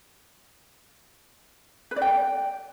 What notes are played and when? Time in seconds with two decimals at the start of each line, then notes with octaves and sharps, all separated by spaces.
1.91 B4
1.96 D5
2.02 G5